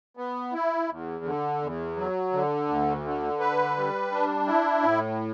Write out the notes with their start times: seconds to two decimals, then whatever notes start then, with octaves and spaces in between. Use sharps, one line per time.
0.17 B3
0.53 E4
0.89 E2
1.25 D3
1.61 E2
1.96 F#3
2.33 D3
2.69 D2
3.04 D3
3.40 B4
3.77 G3
4.12 D4
4.47 E4
4.83 A2